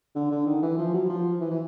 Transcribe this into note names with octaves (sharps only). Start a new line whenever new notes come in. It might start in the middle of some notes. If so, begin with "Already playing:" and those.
D3
D3
D#3
E3
F3
F#3
F3
E3
E3